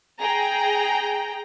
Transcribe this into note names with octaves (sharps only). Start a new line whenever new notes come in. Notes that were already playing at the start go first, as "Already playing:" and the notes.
G#4 G5 A#5